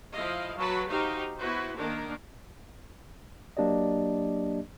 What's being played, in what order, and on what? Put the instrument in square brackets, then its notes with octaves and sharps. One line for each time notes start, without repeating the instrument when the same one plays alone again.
[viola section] F3 E4 D#5 F5
F#3 F#4 B4 A5 B5
D#4 F#4 G4 C5 F5
B3 E4 F#4 B4 C5
D#3 A#3 D4 A#4
[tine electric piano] F#3 A#3 D4 G4 D5 D#5